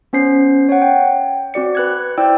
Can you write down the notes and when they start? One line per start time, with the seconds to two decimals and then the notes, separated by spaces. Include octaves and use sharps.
0.13 B3 C#4 C5 C7
0.69 C#5 F#5
0.82 G5
1.54 C4 F#4 D5 C#7
1.75 B4 F#6 G#6
2.18 E4 C5 D5 G5 E6